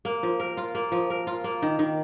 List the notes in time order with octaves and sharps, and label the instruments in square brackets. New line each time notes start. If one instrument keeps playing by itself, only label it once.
[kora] A#3
F3
A#4
F4
A#3
F3
A#4
F4
A#3
D#3
D#3